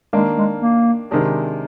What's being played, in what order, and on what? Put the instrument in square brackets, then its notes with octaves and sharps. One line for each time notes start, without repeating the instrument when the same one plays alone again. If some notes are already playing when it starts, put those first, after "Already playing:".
[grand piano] D#3 A#3 D4 [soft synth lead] G#3
[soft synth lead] G#3
A#3
[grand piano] C3 D#3 G#3 D4 G#4